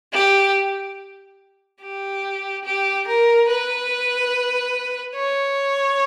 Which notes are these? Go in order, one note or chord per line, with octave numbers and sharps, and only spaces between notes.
G4
G4
G4
A#4
B4
C#5